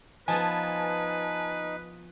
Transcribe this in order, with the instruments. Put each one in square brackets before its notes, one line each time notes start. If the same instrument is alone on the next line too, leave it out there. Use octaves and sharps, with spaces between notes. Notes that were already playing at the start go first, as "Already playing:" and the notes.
[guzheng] F3 B3 [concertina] D#4 [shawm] B4 [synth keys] G#5 A5